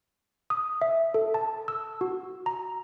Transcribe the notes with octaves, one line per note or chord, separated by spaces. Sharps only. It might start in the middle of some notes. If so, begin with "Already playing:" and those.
D#6
E5
A4
A5
E6
F#4
A#5